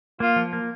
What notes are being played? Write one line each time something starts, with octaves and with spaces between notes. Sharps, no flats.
A#3 F4
F3
A#3